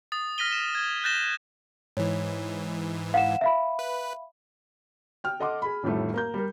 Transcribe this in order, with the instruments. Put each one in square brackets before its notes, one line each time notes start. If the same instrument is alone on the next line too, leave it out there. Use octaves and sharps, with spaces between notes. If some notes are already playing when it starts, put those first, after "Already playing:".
[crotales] D#6 A6
F6 A#6 B6 D#7 G7
E7
G#6
F#6 G6 A6 A#6 E7 G7
[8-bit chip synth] G#2 E3 [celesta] C#5
[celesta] F5 F#5 E7
E5 F5 B5
[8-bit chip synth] B4
[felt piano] G5 F6
A4 D#5 F#5 C6 D6
G#4 B5
A1 F2 A2 D#3 G3 A3
A#3 A#5 G6
G3 A#4